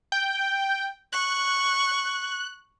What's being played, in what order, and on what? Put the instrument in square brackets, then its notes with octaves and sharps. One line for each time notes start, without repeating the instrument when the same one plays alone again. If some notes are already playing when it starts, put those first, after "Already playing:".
[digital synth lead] G5
[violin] C#6 [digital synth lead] F#6